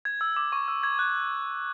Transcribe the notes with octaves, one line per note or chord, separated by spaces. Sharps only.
G#6
E6
D6
C#6
E6
G#6
F#6